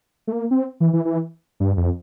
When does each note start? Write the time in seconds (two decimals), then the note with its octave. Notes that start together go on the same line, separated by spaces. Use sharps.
0.27 A3
0.32 A#3
0.51 C4
0.80 E3
0.93 E3
1.05 E3
1.60 G2
1.77 F2